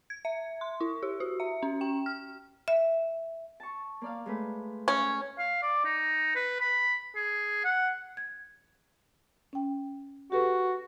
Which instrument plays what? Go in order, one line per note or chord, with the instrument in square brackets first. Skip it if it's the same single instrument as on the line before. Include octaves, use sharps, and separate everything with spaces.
[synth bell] G#6
E5
C6
E4
G4
F#4
E5
C#4
G5
F6
[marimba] E5
[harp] A5 C#6
A#3 D5 F5
G#3 A3 B4
[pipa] C#4
[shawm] F5
D5
D#4
B4
B5
G#4
F#5
[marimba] G#6
C#4 G5
[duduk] F#4 [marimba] G4 A4 B4